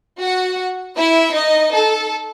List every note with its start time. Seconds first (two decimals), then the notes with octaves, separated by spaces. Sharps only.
0.20 F#4 F#5
0.98 E4 E5
1.36 D#4 D#5
1.74 A4